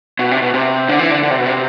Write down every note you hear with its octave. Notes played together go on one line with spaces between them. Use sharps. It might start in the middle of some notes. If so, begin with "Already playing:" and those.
B2
C3
B2
C3
D3
E3
D3
D3
C3
B2
C3